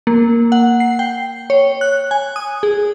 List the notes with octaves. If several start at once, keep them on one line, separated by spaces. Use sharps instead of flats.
A#3
F#5
C7
G5
C#5
F#6
G#5
D#6
G#4